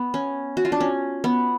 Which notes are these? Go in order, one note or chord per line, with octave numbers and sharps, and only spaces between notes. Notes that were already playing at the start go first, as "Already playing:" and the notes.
Already playing: B3
C#4
F#4
F4
D4
C#4
B3